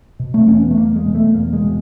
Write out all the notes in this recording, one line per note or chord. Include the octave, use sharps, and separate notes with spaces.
B2
A3
C4
E2 C#4
B3
A3
E2 A#3
G#3
B2
A3
E2 A#3
G#3
B2